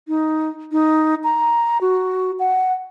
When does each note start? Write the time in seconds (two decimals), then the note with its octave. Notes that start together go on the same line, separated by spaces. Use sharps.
0.08 D#4
0.72 D#4
1.24 A#5
1.81 F#4
2.39 F#5